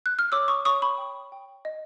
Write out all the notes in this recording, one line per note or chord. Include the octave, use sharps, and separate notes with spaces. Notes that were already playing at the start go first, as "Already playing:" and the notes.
F#6
F6
C#5 D6 E6
C#6 D#6
C#5 C#6 D#6
B5 C#6
G5
G5
D#5